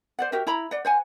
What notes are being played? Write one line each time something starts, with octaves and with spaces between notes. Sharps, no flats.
C5 D5 F#5
F#4 G4 A#4 E5
E4 A#5 B5
D5 F#5
C5 F#5 G#5